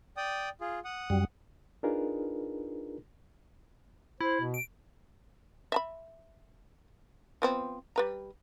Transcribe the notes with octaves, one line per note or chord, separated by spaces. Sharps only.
D5 G5 D#6
F4 G#4
F#5 D#6
F#2 G3
D4 D#4 F4 G#4 A#4 B4
E4 C5
B2
D7
E5 A5 B5
F3 B3 C4
G3 B4 A#5